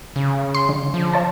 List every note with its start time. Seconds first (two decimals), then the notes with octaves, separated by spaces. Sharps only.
0.16 C#3
0.55 C6
0.69 D3
0.94 F3
1.13 C#5 A5